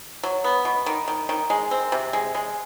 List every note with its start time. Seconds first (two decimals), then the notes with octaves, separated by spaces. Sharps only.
0.23 F#3
0.44 B3
0.65 B2
0.86 D#3
1.08 D#3
1.29 D#3
1.50 G#3
1.71 C4
1.92 C3
2.13 G#3
2.35 G#3